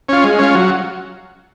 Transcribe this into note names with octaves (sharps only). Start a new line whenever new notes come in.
C#4 F4
G#3
C#4 F4
F#3